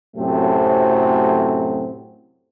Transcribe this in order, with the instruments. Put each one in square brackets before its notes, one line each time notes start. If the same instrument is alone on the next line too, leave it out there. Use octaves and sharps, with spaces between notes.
[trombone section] F#2 A2 C3 F#3 A3 C4